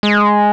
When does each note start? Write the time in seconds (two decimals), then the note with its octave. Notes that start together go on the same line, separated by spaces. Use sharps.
0.03 G#3